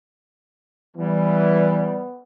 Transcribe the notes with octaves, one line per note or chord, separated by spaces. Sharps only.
E3 G3 B3